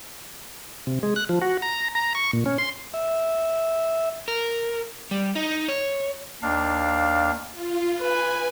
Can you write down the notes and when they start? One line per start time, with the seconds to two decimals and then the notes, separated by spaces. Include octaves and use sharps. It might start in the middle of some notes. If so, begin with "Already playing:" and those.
0.87 C3
1.03 G#3
1.16 F#6
1.29 F3
1.42 F#4
1.62 A#5
1.95 A#5
2.15 C#6
2.33 A#2
2.46 C#4
2.58 C6
2.94 E5
4.28 A#4
5.11 G3
5.36 D#4
5.68 C#5
6.43 D#2 D4 F5
7.52 F4
7.99 B4 G#5